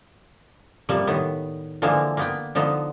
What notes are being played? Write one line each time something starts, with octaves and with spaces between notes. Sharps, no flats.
C3 F3 G3 A#3
A2 D#3 B3
D3 E3 F3 G#3 A#3
A#3 B3 G5
D3 F3 B3 D#4